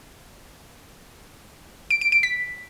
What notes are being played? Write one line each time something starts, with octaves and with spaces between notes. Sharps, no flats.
D7
D7
D7
B6